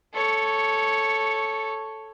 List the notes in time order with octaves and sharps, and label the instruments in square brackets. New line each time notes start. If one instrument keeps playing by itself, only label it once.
[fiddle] A4 C#5